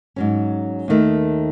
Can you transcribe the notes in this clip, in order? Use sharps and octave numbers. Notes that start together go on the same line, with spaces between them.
G#2 F#3 C#4
D#2 D#3 A3